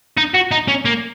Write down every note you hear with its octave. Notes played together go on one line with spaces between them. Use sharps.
D#4
F#4
D#4
C#4
A#3